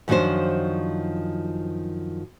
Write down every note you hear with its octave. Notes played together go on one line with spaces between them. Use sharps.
F#2 D#3 F3 D4 F#4 C5